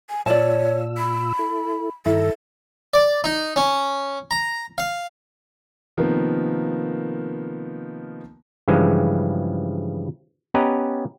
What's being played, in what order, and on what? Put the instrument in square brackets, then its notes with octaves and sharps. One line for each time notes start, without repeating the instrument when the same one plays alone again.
[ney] G#5
[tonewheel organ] A#2 F4 E6 [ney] C#5 [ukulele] D5 A5
[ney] B5
[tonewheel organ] E4 A4
[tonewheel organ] G2 D#3 A#5 [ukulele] E4 [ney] A4
[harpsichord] D5
D#4
C#4
A#5
F5
[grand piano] C3 D#3 F3 A#3 B3
[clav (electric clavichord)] G2 C#3 E3 F3 G#3
B3 C#4 G4 B4 D#5 A#5